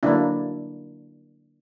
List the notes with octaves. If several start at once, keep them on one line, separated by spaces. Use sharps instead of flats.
D3 F#3 A#3 D4 E4